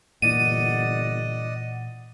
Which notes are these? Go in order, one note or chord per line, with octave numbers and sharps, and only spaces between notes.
G1 A#2 E3 D5 D#5 F#5 D#7